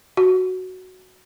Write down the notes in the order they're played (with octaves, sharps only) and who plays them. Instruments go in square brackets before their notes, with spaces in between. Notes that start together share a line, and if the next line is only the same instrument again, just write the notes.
[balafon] F#4